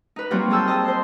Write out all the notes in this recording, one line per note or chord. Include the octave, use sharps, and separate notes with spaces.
D#4 B4
F#3 G3 A#3 C4 F4 F#4
G3 G#4 A5 E6 G6
D#5 A5
C5 C6